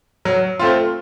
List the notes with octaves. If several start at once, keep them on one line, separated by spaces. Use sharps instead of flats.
F#3
A3 C4 F4